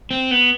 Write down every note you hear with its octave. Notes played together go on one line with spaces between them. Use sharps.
C4
B3